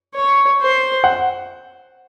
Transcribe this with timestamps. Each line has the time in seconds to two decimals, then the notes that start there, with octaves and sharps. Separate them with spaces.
0.14 C#5
0.61 C5
1.04 F#5